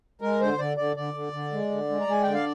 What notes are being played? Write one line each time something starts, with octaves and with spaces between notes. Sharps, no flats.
G#3 A#4
D3 C5
D3 D5
D3 D5
D3 D5
D3
D3
G#3
D3
G#3
A#5
G#3 G#5
D3 G5
F5